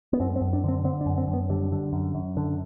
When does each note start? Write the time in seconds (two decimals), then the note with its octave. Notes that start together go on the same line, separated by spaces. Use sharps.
0.13 B3
0.20 F#2 C4
0.36 C4
0.41 F#2
0.53 D4
0.64 D3 C4
0.84 D3 C4
1.01 D4
1.06 F#2
1.18 C4
1.28 F#2
1.33 B3
1.50 D3 G3
1.72 D3
1.93 F#2
2.15 F#2
2.37 D3